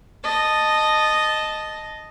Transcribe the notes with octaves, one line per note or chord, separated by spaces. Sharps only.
D#5 A5